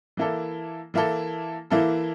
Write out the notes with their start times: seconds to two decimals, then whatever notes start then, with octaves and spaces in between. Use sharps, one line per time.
0.17 E3 A#3 E4 A4
0.94 E3 A#3 E4 A4
1.70 E3 A#3 E4 A4